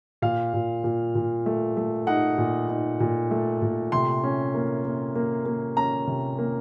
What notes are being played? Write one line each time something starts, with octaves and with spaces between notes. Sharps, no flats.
A#2 F5
A#2
A#2
A#2
A3
A3
D#4 F#5
A#2
D#4
A#2
A3
A#2
C3 C6
C#4
A#3
A#3
A#3
A#3
C#4 A#5
C3
A#3